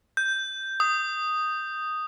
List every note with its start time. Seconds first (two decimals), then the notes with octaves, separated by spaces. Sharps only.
0.17 G6
0.80 D#6